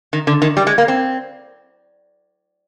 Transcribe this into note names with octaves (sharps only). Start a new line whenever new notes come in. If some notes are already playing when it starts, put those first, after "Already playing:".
D#3
D3
D#3
G3
G#3
A#3
C4